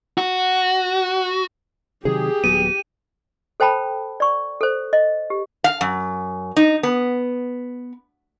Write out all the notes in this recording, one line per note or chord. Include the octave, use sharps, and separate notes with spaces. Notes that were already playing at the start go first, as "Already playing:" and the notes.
F#4
C3 D#3 F#3 G4 G#4
D#1 F#3 B3 D#7
A4 C5 G5 A5 B5
D5 C#6
A4 C5
D#5
G4
F5
F#2
D#4
B3